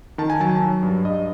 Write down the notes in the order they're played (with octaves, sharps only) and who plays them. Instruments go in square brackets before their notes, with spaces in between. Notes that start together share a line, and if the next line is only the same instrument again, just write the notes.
[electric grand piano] D#3 A5
G#5
F#3 A5
F#3
G2
G2 D#5